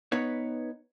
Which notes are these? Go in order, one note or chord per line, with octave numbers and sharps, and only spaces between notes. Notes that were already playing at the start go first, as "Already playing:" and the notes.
B3 D#4 B4 C#5